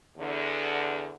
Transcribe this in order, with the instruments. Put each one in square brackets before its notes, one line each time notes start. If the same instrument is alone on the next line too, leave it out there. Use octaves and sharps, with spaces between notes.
[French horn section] E2 D3